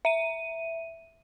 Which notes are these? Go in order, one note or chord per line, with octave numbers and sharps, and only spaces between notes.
E5 D#7